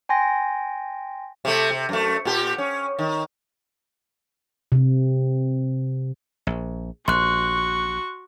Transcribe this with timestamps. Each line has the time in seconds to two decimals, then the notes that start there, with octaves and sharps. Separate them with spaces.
0.09 G5 G#5 C6 A#6
1.45 C3 A3
1.70 C3
1.89 F#2 A3
2.25 A#2 G4
2.58 C#4
2.99 D#3
4.72 C3
6.47 A#1
7.08 A#1 F#4 C6 C#6 F#6